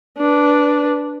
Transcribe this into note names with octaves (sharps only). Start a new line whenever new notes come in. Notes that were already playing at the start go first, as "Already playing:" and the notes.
D4 B4